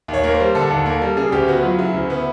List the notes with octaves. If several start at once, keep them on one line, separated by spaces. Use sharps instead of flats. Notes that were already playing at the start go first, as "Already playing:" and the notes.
D#2
C#5
A#3
C5
G3
D3 A4
D#2
A#3
G3
C#3 G#4
D2 G4
B3 F#4
F#3 F4
C#3 E4
D2
B3